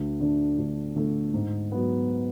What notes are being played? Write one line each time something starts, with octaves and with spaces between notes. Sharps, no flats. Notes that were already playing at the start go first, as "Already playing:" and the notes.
Already playing: D2
D3 A3 D4
D2
D3 A3 D4
G#2
F#3 B3